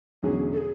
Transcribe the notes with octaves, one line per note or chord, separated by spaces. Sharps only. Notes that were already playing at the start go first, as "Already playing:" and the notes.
E1 E2 D3 F#3 C#4 G#4
A4
G#4